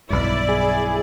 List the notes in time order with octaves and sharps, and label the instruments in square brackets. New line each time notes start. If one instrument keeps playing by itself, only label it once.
[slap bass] B1 G2 [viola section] E4 D5
[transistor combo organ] G#4